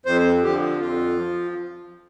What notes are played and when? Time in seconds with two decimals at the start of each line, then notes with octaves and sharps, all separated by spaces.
0.06 F2 C5
0.43 D3 F3 G4
0.80 F2 F4
1.17 F3